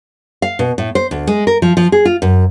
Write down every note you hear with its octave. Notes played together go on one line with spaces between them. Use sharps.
F5
B2
A2
C5
D2
G#3
A#4
F3
F3
G#4
F4
F#2